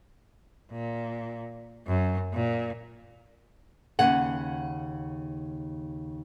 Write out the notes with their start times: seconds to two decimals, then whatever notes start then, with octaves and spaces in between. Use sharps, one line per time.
0.71 A#2
1.87 F#2
2.34 A#2
3.99 D#2 C#3 F#5